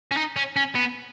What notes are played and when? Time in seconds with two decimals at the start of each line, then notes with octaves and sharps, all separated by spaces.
0.12 C#4
0.17 D#4
0.36 C#4
0.56 C#4
0.75 B3